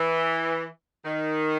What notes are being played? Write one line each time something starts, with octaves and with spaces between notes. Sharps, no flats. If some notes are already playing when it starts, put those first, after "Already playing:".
Already playing: E3
D#3